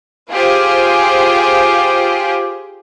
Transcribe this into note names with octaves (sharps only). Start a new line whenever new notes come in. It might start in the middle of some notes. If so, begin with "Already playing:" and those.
F4 G4 G#4 C5